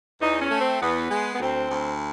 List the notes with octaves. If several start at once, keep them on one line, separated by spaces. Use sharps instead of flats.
E2 D#4
C#4
A3
C4
E2 B3
G#3
B3
D2 C4
D2